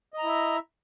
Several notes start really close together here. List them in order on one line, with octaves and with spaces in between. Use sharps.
D#5 A#5 E4 E5